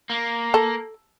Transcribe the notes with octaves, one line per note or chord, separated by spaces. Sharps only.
A#3
A4